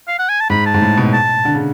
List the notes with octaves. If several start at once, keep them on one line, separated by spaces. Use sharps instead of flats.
F5
F#5
G#5
A5
G#2 B5
A5
G#2
A2
B2
A5
D3
C#3